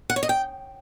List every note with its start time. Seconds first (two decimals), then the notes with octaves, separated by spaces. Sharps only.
0.10 F#5
0.16 C#5
0.23 D#5
0.29 G5